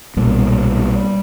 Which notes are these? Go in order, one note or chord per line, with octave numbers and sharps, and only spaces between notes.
B1 A#2 G3